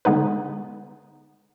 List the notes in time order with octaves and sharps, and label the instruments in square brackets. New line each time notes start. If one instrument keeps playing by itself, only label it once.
[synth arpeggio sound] D3 G#3 B3 D#4 B4